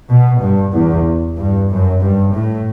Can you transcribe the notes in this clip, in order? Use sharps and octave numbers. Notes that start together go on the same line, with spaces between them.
B2
G2
E2
G2
F#2
G2
A2